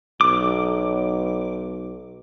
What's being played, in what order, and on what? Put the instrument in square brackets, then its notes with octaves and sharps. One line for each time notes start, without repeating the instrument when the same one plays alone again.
[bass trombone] B1 [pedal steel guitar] D6